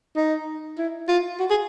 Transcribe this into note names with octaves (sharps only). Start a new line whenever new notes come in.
D#4
E4
F4
F#4
G#4